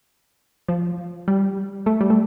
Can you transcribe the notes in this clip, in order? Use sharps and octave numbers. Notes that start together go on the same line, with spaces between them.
F3
G3
A3
G3
A3